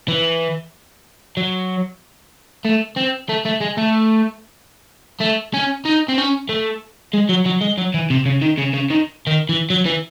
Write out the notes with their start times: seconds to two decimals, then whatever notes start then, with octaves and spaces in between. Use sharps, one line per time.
0.08 E3
1.37 F#3
2.65 A3
2.97 C4
3.29 A3
3.45 A3
3.60 G#3
3.77 A3
5.21 A3
5.54 C#4
5.85 D#4
6.08 C4
6.18 C#4
6.49 A3
7.14 G#3
7.30 F#3
7.46 F#3
7.61 G#3
7.78 F#3
7.94 E3
8.10 C3
8.26 C#3
8.42 D#3
8.58 C#3
8.74 C#3
8.91 D#3
9.27 D#3
9.49 E3
9.70 F#3
9.86 E3